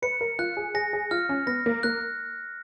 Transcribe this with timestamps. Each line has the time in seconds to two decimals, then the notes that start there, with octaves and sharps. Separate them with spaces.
0.02 B4 C#7
0.21 A#4
0.39 F4 F#6
0.57 G#4
0.74 G#4 A#6
0.93 G#4
1.11 F4 F6
1.29 C#4
1.47 B3 A#6
1.66 A#3
1.83 A#3 F#6